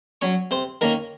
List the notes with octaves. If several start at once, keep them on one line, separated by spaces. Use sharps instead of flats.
F#3 C#4 C#5 C#6
C3 C5 C6
D#3 A#3 C#4 A#4 A#5